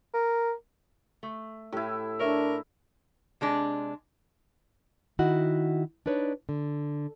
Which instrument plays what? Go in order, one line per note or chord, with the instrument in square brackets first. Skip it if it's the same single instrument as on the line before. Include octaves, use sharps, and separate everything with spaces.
[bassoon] A#4
[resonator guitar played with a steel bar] A3
[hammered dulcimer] A2 E4 [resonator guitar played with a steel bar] G4
[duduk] D4 [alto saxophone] A#4 [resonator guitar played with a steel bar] C#5 E5
[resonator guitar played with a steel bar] C3 G#3 D4
[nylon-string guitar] D#3 E4 F#4 D#5 F#5
D4 D#4 B4 C#5
D3